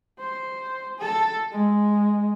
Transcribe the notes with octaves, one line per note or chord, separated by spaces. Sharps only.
C5
A4 A5
G#3